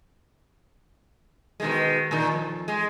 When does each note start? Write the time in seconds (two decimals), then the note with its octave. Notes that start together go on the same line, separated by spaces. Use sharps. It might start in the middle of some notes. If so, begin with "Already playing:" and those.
1.60 B2 D#3 G#3
2.11 A#2 D#3
2.32 F2
2.68 G#3